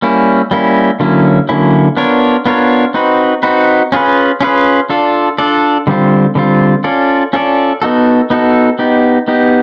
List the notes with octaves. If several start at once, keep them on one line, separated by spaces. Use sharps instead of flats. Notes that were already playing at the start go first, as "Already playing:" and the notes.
G3 A#3 C#4 E4
G3 A#3 C#4 E4
D3 F#3 A#3 C#4 E4
D3 F#3 A#3 C#4 E4
B3 D4 F4 A#4 C#5
B3 D4 F4 A#4 C#5
C4 D#4 F#4 B4
C4 D#4 F#4 B4
C#4 F4 G#4 B4
C#4 F4 G#4 B4
D4 F4 A4 D5
D4 F4 A4 D5
D3 G3 C4 F4
D3 G3 C4 F4
C#4 F4 A4 D5
C#4 F4 A4 D5
B3 D#4 F#4 A4
B3 D#4 F#4 A4
B3 D#4 G4
B3 D#4 G4